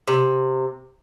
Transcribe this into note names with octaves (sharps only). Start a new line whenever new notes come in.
C3